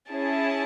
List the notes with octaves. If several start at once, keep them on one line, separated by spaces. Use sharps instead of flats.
C#4 E4 G#4 A5